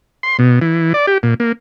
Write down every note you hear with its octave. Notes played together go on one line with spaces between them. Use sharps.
C6
B2
E3
D5
G4
A#2
A#3